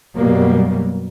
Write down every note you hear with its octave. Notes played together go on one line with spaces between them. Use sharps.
F#2 B2 F#3 G3 A#3